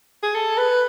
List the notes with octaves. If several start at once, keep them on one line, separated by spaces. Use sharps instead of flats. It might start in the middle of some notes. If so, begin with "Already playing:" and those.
G#4
A4
B4